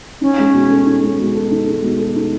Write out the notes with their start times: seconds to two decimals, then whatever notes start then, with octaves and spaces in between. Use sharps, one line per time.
0.21 C#4 D#4
0.38 G#3
0.54 B2
0.70 A4
0.86 D#4
1.03 G#3
1.19 B2
1.35 A4
1.51 D#4
1.67 G#3
1.83 B2
2.00 A4
2.16 D#4